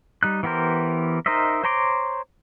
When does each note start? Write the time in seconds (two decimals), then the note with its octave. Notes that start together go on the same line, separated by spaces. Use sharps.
0.23 G3 D#4 F#6
0.43 E3 B3 G4 A#4 C5
1.26 D#4 A#4 C5 D#5 E5
1.64 C5 C#5 A#5 C6 D6